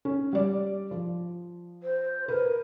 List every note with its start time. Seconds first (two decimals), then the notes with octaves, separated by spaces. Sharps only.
0.05 C#4
0.33 G3 D5
0.91 F3
1.83 C5
2.28 A#4 B4